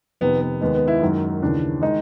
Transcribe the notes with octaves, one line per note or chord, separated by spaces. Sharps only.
F2 C3 D#3 B3
B3
D#2 D#3 G#3 B3
B3
E4
F#2 D#3 G#3
D#2 C#3 E3 D4
D#3 G#3 D#4